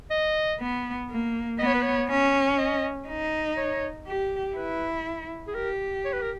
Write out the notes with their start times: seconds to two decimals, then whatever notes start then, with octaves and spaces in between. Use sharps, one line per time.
0.10 D#5
0.60 B3
1.10 A#3
1.59 B3 D#5
1.66 C#5
1.74 B4
1.83 C#5
2.09 C#4
2.58 D#5
3.08 D#4
3.57 C#5
4.07 G4
4.56 E4 B4
5.48 G#4
5.55 G4 A#4
6.05 C#5
6.13 B4
6.22 A#4